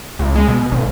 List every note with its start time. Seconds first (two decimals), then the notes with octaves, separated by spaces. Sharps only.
0.19 C#2
0.35 G#3
0.48 B2
0.72 G#1